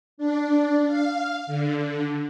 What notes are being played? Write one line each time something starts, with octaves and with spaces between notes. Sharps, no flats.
D4
F5
D3